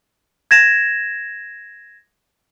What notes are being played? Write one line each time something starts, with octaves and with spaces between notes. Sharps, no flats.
G#6 A#6 E7